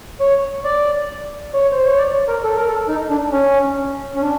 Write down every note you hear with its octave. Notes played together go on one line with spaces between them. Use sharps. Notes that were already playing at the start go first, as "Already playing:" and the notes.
C#5
D5
C#5
C5
C#5
D5
C#5
A#4
A4
A#4
A4
D#4
D4
C#4
C#4
D4